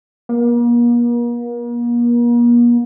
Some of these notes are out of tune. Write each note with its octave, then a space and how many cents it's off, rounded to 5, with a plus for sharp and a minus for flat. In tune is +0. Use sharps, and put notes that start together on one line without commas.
A#3 +40